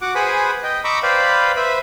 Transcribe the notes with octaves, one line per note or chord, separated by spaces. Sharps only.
F#4 F#5 D6
G#4 B4 C5 F#5 G#5 B5
D#5 G5
D#5 A#5 B5 C#6 D6 E6
B4 C5 D5 F5 G5 B5
B4 C5 E5 B5